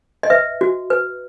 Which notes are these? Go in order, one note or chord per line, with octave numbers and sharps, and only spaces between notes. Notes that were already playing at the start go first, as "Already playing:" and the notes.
D#5
B4 E5
F#4
B4